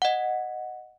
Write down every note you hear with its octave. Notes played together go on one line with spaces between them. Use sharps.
D#5 F#5